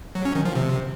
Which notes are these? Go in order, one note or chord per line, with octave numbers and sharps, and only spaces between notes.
F#3
C#4
D#3
F3
C3